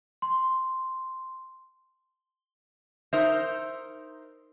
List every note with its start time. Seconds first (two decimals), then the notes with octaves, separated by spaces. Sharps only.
0.22 C6
3.13 D#4 A#4 C5 E5